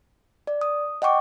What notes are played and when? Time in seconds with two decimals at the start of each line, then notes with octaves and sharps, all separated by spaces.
0.47 D5
0.61 D#6
1.02 D#5 F#5 G5 C#6 D6